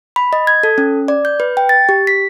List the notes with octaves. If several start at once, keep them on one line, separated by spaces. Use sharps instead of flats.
B5
D#5
G#6
A4
C#4
D5
G6
B4
G5
A6
G4
B6